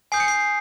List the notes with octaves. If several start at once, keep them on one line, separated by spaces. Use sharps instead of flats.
G#5 D#6 G6 C7
C#7
C7